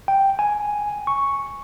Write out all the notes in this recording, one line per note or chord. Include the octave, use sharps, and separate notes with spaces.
G5
G#5
C#6